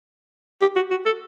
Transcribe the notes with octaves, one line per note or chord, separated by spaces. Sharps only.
G4
F#4
F#4
A4